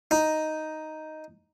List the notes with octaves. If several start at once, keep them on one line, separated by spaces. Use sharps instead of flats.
D#4